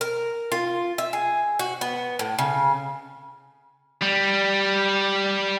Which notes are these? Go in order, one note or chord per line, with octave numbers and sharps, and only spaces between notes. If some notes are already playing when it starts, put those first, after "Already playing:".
A#4
F4
E5
G#4
F#4
B3
A2
C#3
G3